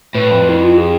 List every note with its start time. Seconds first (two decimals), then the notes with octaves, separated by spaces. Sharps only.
0.14 A2 B4
0.31 F2
0.49 E4
0.63 F4
0.78 G#4